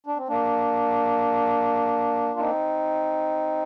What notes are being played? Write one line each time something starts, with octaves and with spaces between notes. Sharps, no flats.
D4
C4
A#3 D4
F4
C4 D#4